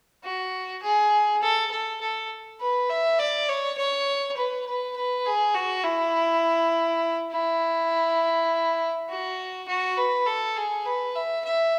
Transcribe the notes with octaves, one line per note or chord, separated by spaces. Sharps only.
F#4
G#4
A4
A4
A4
B4
E5
D5
C#5
C#5
B4
B4
B4
G#4
F#4
E4
E4
F#4
F#4
B4
A4
G#4
B4
E5
E5